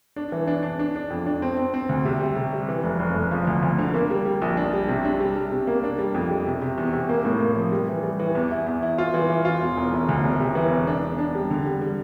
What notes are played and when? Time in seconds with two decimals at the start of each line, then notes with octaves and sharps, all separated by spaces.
0.16 D4
0.32 E3
0.48 D4
0.63 D4
0.79 D4
0.96 D4
1.10 F2
1.26 D4
1.42 C4
1.57 C4
1.74 C4
1.89 D2
2.05 C3
2.21 G3
2.36 C3
2.53 G3
2.69 E3
2.84 F1
3.00 F1
3.15 F1
3.31 F3
3.47 D2
3.63 D2
3.78 D3
3.94 A#3
4.10 G3
4.26 G3
4.42 A#1
4.57 D4
4.73 G3
4.88 C3
5.05 D4
5.20 G3
5.36 G3
5.52 C3
5.67 A#3
5.84 D4
5.98 G3
6.14 F2
6.30 G3
6.46 C3
6.62 C3
6.78 E2
6.93 C3
7.09 A#3
7.25 A2
7.40 A#3
7.56 F3
7.72 G3
7.88 E3
8.03 G3
8.19 E3
8.35 E2
8.51 E4
8.66 E2
8.83 E4
8.98 F4
9.14 E3
9.30 E3
9.45 F4
9.61 E1
9.77 E1
9.93 E1
10.09 D2
10.24 E1
10.40 C3
10.55 E3
10.71 E1
10.87 D4
11.02 D4
11.19 D4
11.35 G3
11.51 D3
11.66 G3
11.81 G3